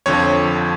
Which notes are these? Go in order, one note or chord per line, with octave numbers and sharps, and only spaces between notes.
F2 D3 F3 C#5